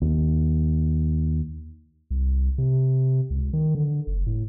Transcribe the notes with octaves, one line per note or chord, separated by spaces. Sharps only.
D#2
C2
C3
C#2
D#3
D3
F#1
A2